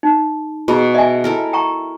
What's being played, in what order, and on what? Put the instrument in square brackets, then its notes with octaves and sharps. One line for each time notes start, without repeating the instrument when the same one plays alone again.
[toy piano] D#4
[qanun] B2 [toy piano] E4 G#4 B5
[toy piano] D#5 E5 G#5
[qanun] E4 A4 A#4
[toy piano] G5 A#5 C#6